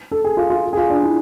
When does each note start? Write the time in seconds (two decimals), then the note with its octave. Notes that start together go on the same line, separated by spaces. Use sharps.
0.11 A4
0.24 G#4
0.37 F4
0.50 F4
0.73 G#4
0.77 F4
0.90 D4
1.04 E4